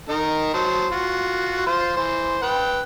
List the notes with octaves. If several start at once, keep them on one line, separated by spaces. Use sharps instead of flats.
D#3 D#4 A#4
F#3 C5 A5
F4 F#4
F4 C5
E3 C5
B4 G5